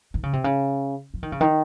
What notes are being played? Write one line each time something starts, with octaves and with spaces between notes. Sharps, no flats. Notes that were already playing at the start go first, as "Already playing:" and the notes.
D#3
C#3
C3
C#3
F3
D#3
C#3
D#3